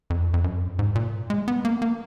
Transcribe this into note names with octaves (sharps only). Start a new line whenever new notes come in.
F2
F2
F#2
G#2
A#2
G#3
B3
A#3
A#3